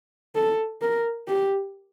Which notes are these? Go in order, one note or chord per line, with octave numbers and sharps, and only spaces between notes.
A4
A#4
G4